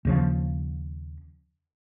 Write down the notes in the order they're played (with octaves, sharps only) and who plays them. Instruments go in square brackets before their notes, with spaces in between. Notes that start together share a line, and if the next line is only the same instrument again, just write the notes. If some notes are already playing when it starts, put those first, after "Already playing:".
[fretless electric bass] D#2 C#3 F3